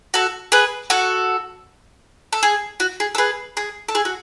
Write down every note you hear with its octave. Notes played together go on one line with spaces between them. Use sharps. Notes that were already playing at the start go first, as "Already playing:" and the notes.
F#4 A4
G#4 B4
F#4 A4
A4
G#4
F#4
G#4
A4
G#4 B4
G#4
A4
G#4
F#4